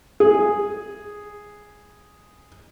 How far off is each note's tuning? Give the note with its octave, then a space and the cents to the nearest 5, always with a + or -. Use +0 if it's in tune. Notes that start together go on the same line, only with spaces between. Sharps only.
G#4 -5